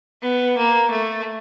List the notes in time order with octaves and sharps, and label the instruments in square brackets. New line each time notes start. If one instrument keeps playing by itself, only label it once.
[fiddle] B3
A#3
A3